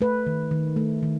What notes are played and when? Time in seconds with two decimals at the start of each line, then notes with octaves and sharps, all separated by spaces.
0.01 A3 B4
0.27 D#3
0.51 D#3
0.76 A3
1.03 D#3